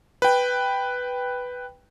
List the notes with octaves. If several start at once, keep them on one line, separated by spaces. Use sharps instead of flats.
B4 G5